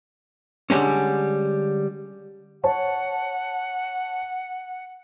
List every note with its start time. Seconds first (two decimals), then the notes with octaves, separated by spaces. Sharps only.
0.70 D3 E3 G3 G#3 C#4
2.64 C#5 F#5 A5